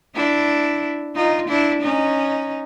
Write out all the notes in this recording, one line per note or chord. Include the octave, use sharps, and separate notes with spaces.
D4 E4
D#4 F4
D4 E4
C#4 D#4